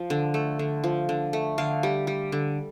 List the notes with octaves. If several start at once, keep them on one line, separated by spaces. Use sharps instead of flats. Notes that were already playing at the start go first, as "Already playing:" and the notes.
Already playing: F3
D3
A3
D3
F3
D3
A3
D3 F5
G3
G3
D3